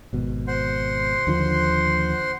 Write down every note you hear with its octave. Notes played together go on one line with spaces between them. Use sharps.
G#1 B2
C5 F#5 C6
D#2 D3 F3